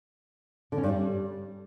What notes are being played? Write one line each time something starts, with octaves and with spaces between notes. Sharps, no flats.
D3
C#4
G2
G3